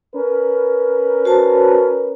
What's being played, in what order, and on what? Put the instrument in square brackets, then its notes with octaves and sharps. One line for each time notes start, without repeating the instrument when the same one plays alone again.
[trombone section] C#4 A#4 B4
[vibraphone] F#4 C5 A5